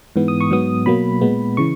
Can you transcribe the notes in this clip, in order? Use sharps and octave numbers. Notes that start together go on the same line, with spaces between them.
G#2 E3 B3
D#6
C#6
G#2 F#3 B3 D#6
B2 F#3 A#3 B5
A#2 G#3 B3
C#3 E3 C#6